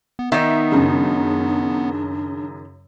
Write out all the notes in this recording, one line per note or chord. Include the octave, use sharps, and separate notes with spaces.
B3
D#3 B3 D#4 E5
F#2 C#3 D4